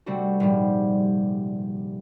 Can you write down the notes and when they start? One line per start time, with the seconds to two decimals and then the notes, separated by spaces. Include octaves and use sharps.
0.06 C3 G3 A3 C4 D4 F#4
0.40 D#1 G#2 F3 G3